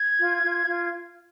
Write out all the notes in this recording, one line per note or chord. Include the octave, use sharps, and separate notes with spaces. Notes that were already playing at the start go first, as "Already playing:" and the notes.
Already playing: G#6
F4
F4
F4